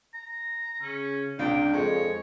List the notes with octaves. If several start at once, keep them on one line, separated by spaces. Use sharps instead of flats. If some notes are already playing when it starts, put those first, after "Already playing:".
A#5
C#3 C#4
C#2 C3 D4 F4 G5
F2 G#3 C#5